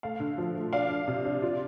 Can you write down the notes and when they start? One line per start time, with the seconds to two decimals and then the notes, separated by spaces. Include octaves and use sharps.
0.03 A3 F5
0.20 D3
0.38 F3
0.55 A3
0.73 D4 F5
0.90 D4
1.08 C3
1.25 D4
1.42 F4